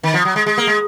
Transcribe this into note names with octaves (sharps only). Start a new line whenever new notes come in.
D#3
F3
F#3
G#3
G#3
A#3
G#3